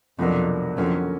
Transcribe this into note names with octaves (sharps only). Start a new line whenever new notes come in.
C2 F2 B2 F#3 A#3 D4
F2 D3 F#3 A#3 C#4